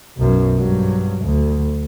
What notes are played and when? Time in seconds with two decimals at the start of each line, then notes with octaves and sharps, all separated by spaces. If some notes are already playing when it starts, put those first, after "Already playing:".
0.17 B1 F#2
0.57 G2 F#3
1.24 D2